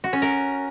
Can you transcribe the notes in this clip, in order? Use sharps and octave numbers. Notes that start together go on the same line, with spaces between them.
F#4
C#4
A#4